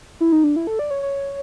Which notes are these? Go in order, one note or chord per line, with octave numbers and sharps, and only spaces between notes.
E4
D#4
D4
E4
A4
D5
C#5
C#5